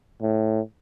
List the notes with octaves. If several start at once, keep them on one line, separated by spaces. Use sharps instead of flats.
A2